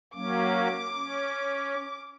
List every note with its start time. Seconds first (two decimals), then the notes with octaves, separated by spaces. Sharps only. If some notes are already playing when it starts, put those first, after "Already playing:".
0.15 F#3 A#3 C#4 D6
0.94 C#4